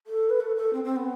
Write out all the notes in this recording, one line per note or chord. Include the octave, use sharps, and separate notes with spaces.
A4
B4
A4
A4
C4
C4
B3